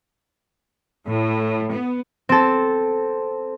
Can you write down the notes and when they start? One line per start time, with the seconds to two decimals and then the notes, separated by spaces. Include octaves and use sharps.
1.07 A2
1.72 B3
2.29 C4 A4